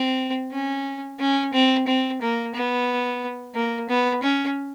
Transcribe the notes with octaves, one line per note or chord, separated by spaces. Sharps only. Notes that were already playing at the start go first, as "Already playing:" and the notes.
Already playing: C4
C#4
C#4
C4
C4
A#3
B3
A#3
B3
C#4